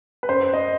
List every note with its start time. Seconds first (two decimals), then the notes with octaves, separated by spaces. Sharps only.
0.23 B4
0.29 F#2 C5
0.53 D#5